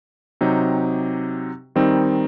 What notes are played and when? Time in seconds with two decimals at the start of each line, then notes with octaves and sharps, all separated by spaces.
0.41 C3 F#3 C4 D#4 G4
1.76 D#3 G3 C4 D#4